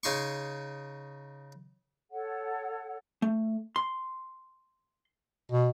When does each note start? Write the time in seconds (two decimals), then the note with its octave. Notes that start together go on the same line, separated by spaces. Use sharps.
0.03 C#3 D#4 C6 C#6
2.11 A4 C#5 F#5
3.22 A3
3.76 C6
5.52 B2